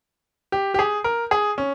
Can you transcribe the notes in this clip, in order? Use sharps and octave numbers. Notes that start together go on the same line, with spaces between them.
G4
G4
G#4
A#4
G#4
C#4